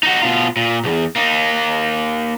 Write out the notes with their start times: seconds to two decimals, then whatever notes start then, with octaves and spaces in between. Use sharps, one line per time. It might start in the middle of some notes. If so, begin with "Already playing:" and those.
0.03 D#4 F#4
0.22 B2 F4
0.56 A#2
0.84 B1 E2
1.16 A#3 D#4